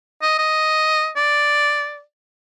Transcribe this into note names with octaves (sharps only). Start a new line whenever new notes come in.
D#5
D#5
D5